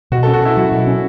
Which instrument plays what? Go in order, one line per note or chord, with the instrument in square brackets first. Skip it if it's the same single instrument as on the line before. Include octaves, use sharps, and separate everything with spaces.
[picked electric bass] B2 [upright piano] F#4
[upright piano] A4
[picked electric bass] C#4
[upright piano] F#4
[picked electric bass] B2 [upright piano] E4
[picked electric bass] F#3 [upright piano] F#4
[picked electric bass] B2
C#4